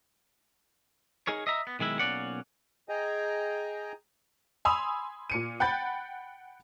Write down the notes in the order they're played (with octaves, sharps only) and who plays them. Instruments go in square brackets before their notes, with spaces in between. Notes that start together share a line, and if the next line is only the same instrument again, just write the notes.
[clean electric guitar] D#4 G#4 A#4 C#5
D#5 E5 A#5
B3
B1 D#3 G#3 E4
B1 A#3 C#4 D5 F#5
[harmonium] G#4 D#5 G5 G#5 A#5
[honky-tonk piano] G#5 B5 C6 D#6 E6 F7
A#2 C#7 D#7
F#5 G5 B5 G6 A6